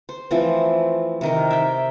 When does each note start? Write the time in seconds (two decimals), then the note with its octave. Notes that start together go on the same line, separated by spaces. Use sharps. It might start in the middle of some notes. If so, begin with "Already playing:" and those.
0.09 C5
0.31 E3 F3 A3 C4
1.21 C3 D#3 A#4
1.51 E5 G5